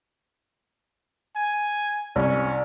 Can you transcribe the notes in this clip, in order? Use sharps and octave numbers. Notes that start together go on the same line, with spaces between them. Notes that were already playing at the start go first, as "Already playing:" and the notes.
G#5
C2 C#4